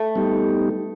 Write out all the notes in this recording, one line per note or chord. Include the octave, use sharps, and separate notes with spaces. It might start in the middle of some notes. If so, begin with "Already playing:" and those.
Already playing: A3
G3 B3 D#4 G4